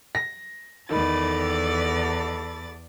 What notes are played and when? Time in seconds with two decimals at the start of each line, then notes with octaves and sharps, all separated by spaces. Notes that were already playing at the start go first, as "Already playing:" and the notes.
0.15 A#6
0.91 E2 D#3 A4 D5 B5 A6